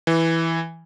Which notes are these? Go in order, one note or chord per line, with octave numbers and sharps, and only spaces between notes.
E3